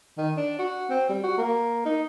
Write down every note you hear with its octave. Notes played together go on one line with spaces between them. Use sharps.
D#3
D4
F#4
C4
G3
F#4
A#3
D#4